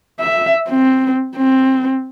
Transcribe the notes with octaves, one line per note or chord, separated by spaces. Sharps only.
E5
C4
C4